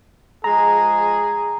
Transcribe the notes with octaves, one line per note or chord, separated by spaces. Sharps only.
F3 G#3 G#4 A#5